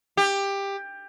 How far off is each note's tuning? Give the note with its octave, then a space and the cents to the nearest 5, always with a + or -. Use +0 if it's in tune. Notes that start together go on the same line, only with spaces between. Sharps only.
G4 +15